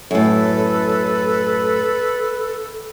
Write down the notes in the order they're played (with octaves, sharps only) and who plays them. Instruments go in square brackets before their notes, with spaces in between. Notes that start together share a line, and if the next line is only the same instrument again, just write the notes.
[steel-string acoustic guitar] F#2 A2 [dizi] A4 [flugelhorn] B4